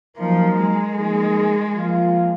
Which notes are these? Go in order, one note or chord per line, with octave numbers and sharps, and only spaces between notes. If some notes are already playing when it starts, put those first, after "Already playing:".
F3 F#3 A#3 D#4 A#4
G#3
F3 A#3 D#4 G#4
F3 A#3 F4